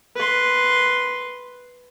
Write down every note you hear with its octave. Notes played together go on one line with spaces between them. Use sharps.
B4 C6